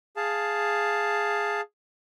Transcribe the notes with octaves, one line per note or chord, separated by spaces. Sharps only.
G#4 F5 A5